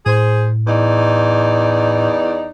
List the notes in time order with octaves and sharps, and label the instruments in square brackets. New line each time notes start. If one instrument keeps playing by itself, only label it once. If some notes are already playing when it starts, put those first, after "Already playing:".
[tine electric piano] A2 [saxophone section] G#4 C5
[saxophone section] E2 D#4 D5